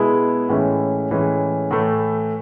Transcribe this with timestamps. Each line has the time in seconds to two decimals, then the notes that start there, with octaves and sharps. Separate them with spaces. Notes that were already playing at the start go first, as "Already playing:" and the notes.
Already playing: B2 G#3 B3 E4 G#4
0.49 A2 E3 G#3 C#4
1.11 A2 E3 G#3 C#4
1.71 A2 E3 A3